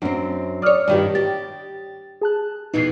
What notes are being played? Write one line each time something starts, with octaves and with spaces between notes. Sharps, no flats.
F#2 C4 D4
C#5 D5 D6 D#6 F6
G2 D#3 G4
G4 A6
G#4 A5 F#6
F2 B2 E3 D#4 C7